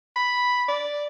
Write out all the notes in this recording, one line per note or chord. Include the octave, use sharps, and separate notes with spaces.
B5
D5